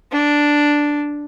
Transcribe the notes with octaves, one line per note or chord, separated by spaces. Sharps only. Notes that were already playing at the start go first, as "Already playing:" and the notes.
D4